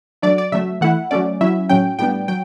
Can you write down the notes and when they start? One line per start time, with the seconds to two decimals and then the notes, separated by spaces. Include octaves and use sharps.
0.22 F#3 A3 D4 D5
0.38 D5
0.52 C#3 F#3 A3 E5
0.81 E3 A3 E4 F#5
1.11 F#3 A3 C#4 D5
1.41 F#3 C#4 E4 E5
1.69 A2 F#3 C#4 G5
1.99 A2 G3 B3 D4 G5
2.28 F#3 G5